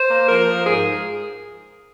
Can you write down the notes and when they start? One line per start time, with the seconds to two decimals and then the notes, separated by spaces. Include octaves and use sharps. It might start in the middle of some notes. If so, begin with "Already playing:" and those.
Already playing: C5
0.09 A#3
0.28 F3 A#4
0.47 F3
0.67 G#2 G#4